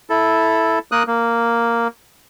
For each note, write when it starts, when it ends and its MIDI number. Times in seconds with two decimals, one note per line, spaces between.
0.10 0.79 64
0.10 0.79 69
0.92 1.03 58
0.92 1.03 70
0.92 1.03 87
0.92 1.03 90
1.07 1.88 58